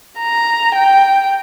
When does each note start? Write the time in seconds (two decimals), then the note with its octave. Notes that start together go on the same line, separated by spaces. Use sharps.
0.20 A#5
0.75 G5